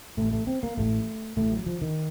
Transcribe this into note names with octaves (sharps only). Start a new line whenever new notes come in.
A1 A2 A3
A3
C4
A#3
A1 A2 A3
A1 A2 A3
F#3
F3
D#3